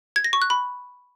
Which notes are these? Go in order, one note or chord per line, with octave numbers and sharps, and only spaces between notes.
G#6
A#6
C#6
F#6
B5